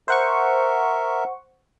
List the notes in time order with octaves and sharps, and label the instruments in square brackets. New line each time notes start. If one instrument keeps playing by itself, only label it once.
[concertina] A#4 E5 [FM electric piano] C5 F#5 C#6